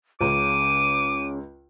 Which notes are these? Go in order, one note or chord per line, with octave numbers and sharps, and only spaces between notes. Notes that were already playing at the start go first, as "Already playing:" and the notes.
C#2 C#3 D6 D#7